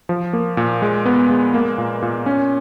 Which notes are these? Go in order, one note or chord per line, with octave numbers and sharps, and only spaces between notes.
F3
A#3
A#2
G#3
B3
G#3
A#3
A#2
A#2
C#4